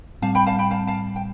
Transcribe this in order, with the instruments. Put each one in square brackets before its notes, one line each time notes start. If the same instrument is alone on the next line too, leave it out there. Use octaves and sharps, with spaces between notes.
[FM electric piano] A2 G3 C4 [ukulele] F5 A5
[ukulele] G5 B5
F5 A5
G5 B5
F5 A5
F5 A5
G5